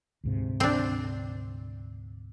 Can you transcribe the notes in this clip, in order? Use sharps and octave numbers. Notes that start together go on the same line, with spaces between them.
D2 G#2 C3
C4 D4